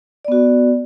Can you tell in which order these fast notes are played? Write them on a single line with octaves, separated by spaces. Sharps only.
D5 B3 F#4